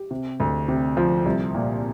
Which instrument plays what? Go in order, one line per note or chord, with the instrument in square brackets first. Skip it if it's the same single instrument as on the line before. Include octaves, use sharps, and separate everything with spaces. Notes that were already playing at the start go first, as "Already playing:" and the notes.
Already playing: [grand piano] G4
C3
D2
C3
F3
C2
A#2